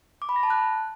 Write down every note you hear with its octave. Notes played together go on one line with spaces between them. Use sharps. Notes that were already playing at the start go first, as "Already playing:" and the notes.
D6
B5
A#6
A5
F#6